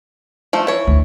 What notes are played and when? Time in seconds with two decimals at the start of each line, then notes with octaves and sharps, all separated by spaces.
0.53 F3 A3
0.67 E3 C#5
0.87 D2